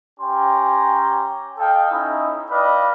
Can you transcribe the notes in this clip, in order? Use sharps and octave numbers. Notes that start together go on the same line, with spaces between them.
C#4 G4 G5 A#5 C6
A4 D#5 F5 G5
C#4 D#4 E4
B4 D5 D#5 F5 G5